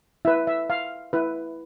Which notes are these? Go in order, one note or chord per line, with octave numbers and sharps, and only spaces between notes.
E4 B4 E5
E5
F5
E4 B4